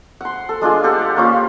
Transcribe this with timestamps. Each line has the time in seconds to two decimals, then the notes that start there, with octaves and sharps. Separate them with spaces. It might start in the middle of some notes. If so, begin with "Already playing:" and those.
0.21 F#5 C6
0.49 A4
0.62 G#3 D4 F4 G#4
0.84 G4 A4 F5 F#5
1.16 A#3 C#4 F4